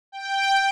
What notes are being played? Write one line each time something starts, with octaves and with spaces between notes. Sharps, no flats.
G5